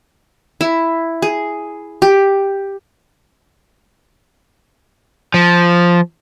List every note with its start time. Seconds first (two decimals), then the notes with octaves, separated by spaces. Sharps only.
0.61 E4
1.22 G#4
2.02 G4
5.34 F3